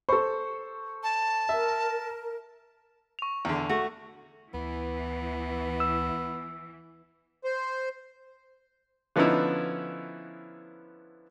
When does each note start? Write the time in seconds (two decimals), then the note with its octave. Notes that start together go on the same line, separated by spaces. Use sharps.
0.09 A4 C5 C#6
1.03 A5
1.49 A#4 E5
3.19 C#6 F7
3.45 E2 D3
3.69 A3 F#4
4.54 D2 E3 B3
5.80 E6
7.44 C5
9.16 D3 F3 B3 C#4 D#4 E4